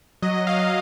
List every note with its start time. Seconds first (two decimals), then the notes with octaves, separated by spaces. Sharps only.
0.22 F#3 D#5
0.47 F#3 F5